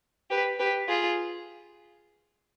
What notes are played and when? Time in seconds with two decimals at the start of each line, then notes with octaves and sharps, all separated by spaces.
0.30 G4 B4
0.59 G4 B4
0.88 F4 G#4